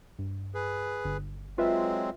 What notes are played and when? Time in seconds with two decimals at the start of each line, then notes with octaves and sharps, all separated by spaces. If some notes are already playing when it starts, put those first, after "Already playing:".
0.19 G2
0.54 G#4 B4
1.05 G1
1.58 F#3 G#3 C4 F4 B4 E5